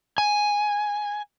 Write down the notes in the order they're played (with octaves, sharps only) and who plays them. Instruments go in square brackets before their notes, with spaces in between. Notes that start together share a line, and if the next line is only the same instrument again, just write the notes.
[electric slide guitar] G#5